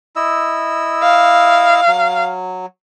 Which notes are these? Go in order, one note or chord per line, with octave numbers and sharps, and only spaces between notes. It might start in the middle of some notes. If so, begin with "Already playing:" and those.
E4 D#5 E6
F5
F#3